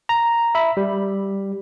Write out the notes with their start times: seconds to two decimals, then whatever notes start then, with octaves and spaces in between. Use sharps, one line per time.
0.09 A#5
0.55 E5 B5
0.77 G3